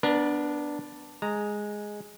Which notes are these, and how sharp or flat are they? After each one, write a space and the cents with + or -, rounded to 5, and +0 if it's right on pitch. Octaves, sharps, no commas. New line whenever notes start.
B3 -5 D4 +0 A#4 +35
G#3 +0 A#5 -10